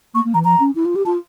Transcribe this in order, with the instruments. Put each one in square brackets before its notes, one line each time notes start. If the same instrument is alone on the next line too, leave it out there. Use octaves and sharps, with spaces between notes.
[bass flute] A#3 [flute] C#6
[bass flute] A#3
[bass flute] E3 [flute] A#5
[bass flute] F3 [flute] A#5
[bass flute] C#4
E4
F4
G4
[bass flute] F4 [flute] A5